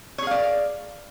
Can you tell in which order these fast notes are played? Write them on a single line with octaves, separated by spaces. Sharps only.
C#5 G#4 F5 D5